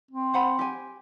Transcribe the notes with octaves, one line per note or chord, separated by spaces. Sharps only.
C4
C5 F#5 B5
G4 G#5